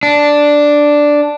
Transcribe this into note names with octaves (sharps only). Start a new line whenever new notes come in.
D4